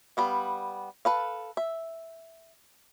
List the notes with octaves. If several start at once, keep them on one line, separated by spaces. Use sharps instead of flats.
G3 B3 F5
A4 B4 F5
E5